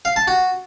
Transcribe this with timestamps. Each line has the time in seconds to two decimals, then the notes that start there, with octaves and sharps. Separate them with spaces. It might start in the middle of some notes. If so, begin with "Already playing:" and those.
0.05 F5
0.16 A5
0.28 F#4